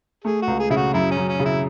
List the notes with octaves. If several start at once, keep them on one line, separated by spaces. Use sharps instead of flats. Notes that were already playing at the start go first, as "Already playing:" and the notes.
A3 G#4
F#4
C#2
G#4
C#3 E4
F#4
F#2 E4
C#4
F#2
C#4
C#3
E4